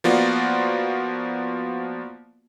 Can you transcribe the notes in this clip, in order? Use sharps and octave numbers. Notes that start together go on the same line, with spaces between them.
F3 A#3 B3 F4 F#4 D5